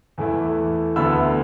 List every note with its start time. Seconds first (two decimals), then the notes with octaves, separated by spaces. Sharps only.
0.18 E2 E3 A3 E4
0.96 D2 D3 B3 E4 B5 E6